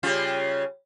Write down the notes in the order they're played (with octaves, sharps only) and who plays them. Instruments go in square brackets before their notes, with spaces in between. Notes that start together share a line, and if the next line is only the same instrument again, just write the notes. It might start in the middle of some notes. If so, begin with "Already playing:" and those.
[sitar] C#3 G3 F4